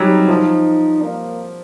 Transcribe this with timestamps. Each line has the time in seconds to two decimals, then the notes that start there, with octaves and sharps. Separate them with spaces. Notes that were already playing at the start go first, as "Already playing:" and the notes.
Already playing: F#3 G3 D#4
0.29 F3
1.02 A#3